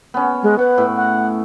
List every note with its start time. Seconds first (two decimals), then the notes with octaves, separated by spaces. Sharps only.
0.14 B3 C#4
0.43 G#3
0.59 B4 F#5
0.78 A2
0.96 F#5